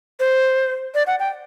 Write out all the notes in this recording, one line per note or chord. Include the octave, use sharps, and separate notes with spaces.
C5
D5
F#5
G5